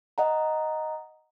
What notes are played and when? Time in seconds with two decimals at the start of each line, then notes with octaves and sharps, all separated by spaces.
0.18 D#5 F#5 A#5